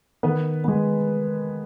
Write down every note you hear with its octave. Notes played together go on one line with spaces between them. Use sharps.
D#3 B3 B4
G#3 B3